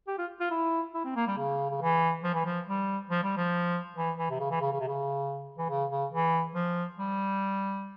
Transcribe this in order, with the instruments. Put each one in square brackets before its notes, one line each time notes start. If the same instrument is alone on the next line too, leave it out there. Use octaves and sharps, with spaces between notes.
[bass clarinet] G4
F4
F4
E4
E4
C4
A#3
G3
C#3
C#3
E3
F3
E3
F3
G3
F3
G3
F3
E3
E3
C3
C#3
E3
C#3
C#3
C3
C#3
E3
C#3
C#3
E3
F3
G3